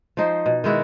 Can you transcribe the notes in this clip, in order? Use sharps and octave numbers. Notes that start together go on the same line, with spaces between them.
F3 D#4 C5
B2
D#3 G#3 E4 F#4